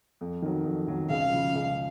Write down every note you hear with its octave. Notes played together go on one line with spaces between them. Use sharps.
F2
D#3 F#3
F2
D#3 F#3
C#2 F5
C#3 F3
C#2